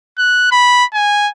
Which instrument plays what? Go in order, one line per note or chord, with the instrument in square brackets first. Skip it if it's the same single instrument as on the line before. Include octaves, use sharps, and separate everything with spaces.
[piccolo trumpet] F#6
B5
G#5